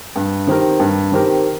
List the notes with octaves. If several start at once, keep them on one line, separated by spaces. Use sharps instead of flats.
G2
D#3 C4 G4 A#4
G2
D#3 C4 G4 A#4